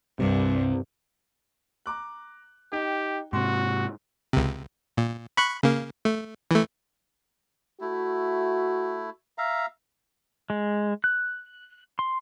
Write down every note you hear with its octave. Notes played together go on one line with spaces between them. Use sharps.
C2 G2 C3
A#5 D6 F#6
D#4 G4 G5
G#2 C3 F#4 C6
C#2 C3
A#2
B5 C#6 F#6
C#3 A#3
A3
E3 A3
A3 E4 F#4
E5 F5 A#5
G#3
F#6
C6